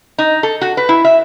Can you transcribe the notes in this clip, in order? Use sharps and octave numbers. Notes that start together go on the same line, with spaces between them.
D#4
A4
F#4
B4
E4
E5